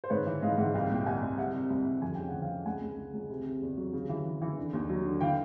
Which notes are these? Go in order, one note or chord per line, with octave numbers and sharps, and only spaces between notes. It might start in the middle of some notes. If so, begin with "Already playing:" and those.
C5
G#2 B4 C#5
E3
G#2 D#5 F5
G#2 E5 F#5
C2 F5 G5
A#2 G5
C2 F#5 G#5
C2
C3 E5 F#5
C3
C2
C2
F2 G#5
C#3 G5
F#5
F3
F5 G5
C#3
C#2 F#5 G#5
C#2
C#3
C#2
C3
C3
E2
F#3
C#3
E3
E3
E3
D3
D#2
F#3
D3
E3 F5 G5